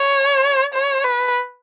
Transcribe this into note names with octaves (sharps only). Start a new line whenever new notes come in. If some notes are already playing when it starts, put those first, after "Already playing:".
Already playing: C#5
C#5
B4